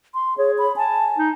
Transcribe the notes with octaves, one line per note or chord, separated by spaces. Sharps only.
C6
G#4 C#5
B5
G#5 A5
D#4